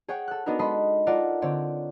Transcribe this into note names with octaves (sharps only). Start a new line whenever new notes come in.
G#4 C#5 F#5 G5
A4 F#6
B3 D4 D#4 F#4 A4 A#4
G#3 A4 D#5 B5 C6
F4 A4 A#4 D5 F#5
D3 C4 C#5 D5